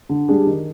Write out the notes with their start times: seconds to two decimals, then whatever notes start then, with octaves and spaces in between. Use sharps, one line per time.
0.09 D3
0.28 G3 D4 G#4
0.47 D#3